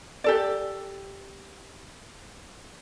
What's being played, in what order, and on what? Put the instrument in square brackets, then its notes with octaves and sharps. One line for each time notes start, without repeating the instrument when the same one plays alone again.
[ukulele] G4 A4 D5